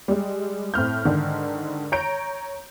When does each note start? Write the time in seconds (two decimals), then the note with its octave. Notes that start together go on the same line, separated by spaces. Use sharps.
0.08 G3 G#3
0.74 A2 C4 F6 G6
1.05 G#2 D3 D#3
1.92 C#5 A#5 G6 D7